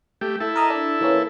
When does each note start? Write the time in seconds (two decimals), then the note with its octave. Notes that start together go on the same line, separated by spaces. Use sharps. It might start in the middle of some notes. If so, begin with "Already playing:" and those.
0.21 A3 G4
0.40 E4 A4
0.56 A#4 D#5 A#5
0.70 D4
1.01 E3 A#3 C#4